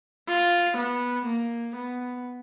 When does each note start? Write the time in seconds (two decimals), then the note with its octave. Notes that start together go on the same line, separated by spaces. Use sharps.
0.28 F4
0.77 B3
1.26 A#3
1.77 B3